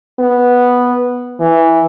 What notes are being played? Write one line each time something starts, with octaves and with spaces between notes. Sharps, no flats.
B3
E3